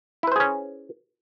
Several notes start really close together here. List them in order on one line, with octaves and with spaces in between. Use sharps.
E4 B4 C5 G#4 C#4